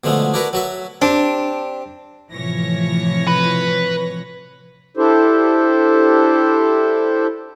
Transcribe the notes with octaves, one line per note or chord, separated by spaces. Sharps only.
B2 D3 F3 G#3 A3
D4 E4 F#4 A#4 B4
F#3 F#4 E5
C4 D4 G4
A2 C3 E3 F3 C#5 A#6
B4
D4 E4 G4 A4 C5